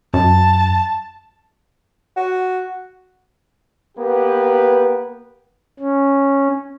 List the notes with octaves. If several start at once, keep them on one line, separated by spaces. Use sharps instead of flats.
F#2 A5
F#4
A#3 B3 G4 B4
C#4